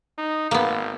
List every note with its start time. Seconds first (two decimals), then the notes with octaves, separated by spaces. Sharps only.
0.18 D#4
0.51 G#1 A#3 B3